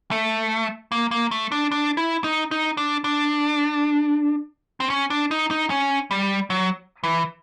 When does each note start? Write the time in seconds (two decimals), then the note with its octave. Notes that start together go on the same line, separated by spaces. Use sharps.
0.11 A3
0.92 A#3
1.11 A#3
1.31 A3
1.52 D4
1.71 D4
1.97 E4
2.24 D#4
2.51 D#4
2.77 D4
3.04 D4
4.80 C4
4.90 C#4
5.10 D4
5.31 D#4
5.51 D#4
5.70 C#4
6.11 G3
6.50 F#3
7.04 E3